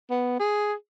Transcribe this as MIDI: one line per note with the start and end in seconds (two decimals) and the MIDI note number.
0.10 0.37 59
0.40 0.73 68